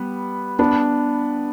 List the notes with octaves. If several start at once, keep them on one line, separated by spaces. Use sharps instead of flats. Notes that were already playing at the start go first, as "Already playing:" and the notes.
Already playing: G3 B3
B3 D4